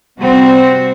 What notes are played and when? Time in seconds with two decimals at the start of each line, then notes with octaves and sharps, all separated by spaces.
0.17 C3 G3 C4 F#4